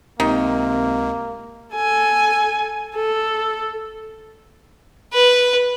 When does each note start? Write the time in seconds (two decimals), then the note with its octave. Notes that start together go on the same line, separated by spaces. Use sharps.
0.20 C#2 C3 D#3 A#3
1.74 A4 G#5
2.96 A4
5.13 B4